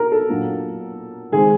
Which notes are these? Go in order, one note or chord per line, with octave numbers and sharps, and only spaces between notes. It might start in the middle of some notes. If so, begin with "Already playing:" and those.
Already playing: B2 A#4
A4
A#2 F#3 A#3 D4
D#3 G#3 C4 G#4